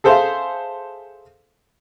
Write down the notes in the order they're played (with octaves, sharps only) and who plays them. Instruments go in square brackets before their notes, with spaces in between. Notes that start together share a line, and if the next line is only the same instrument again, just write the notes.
[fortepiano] G#4 A4 C5 E5 F5